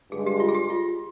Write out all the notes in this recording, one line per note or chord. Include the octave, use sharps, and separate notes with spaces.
G2 D3 G#3 G#4
G4
F4
G#4
G4
F4